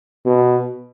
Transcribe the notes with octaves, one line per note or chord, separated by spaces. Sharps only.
B2